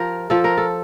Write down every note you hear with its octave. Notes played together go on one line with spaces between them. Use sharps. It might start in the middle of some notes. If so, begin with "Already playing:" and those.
Already playing: F3 G4 A#4
F3 A4
A#4
A4